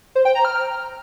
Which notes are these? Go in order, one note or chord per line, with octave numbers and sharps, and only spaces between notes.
C5
G5
A#5
F6